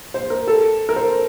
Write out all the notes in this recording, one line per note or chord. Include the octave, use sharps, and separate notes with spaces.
C5
A#4
A4
A#4
C5